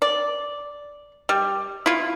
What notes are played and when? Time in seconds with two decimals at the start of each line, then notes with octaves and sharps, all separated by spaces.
0.02 D5
1.29 G3
1.86 E4 F4